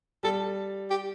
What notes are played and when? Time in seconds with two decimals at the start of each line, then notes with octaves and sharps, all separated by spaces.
0.23 G3 A4
0.90 G4